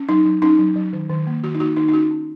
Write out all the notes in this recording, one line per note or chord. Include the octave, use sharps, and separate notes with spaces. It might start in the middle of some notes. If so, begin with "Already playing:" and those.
Already playing: C#4
F#3 D#4
F#3
C#4 D#4
F#3
F#3
D#3
D#3
A#3
D#3 F#4
D#4
A#3 F#4
D#3 D#4
D#4
C#4 F#4
C#4